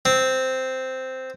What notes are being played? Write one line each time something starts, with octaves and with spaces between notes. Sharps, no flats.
C4